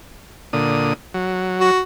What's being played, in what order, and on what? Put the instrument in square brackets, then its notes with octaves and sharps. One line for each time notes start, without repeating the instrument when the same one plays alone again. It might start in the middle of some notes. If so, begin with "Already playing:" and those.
[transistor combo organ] A#2 D3 D#6
F#3
[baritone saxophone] F#4